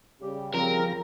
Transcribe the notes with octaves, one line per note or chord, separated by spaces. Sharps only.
C#3 G3 G4
F3 C4 A#4 A#5